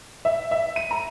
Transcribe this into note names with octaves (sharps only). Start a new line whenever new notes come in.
E5
E5
D#7
A#5